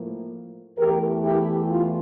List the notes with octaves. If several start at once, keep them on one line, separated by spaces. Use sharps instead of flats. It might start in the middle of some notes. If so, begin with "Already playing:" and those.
Already playing: A2 F3 A#3
E2 E3 A3 G4 A#4
E4 G4
F4